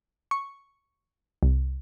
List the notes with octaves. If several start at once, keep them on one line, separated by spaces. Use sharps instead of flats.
C#6
C2